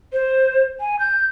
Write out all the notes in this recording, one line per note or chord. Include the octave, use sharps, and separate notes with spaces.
C5
G#5
G6